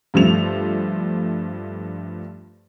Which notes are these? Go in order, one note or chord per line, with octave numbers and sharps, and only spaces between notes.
G2 F3 A3 F7